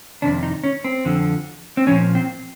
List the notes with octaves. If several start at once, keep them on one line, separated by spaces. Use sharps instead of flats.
F2 C3 D#3 D4
D#4
C#4
C4
F2 D3 F3
C4
A#2 F3 C#4
C4